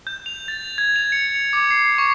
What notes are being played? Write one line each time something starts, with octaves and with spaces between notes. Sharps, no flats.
G6
F7
A6
G#6
F7
C#7
D6
C7
C#6